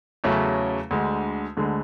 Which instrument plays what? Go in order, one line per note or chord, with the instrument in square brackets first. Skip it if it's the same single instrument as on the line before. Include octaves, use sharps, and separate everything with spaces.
[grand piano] E2 C#3 F#3 A3 C#4
D2 D3 G#3
D2 D3 G#3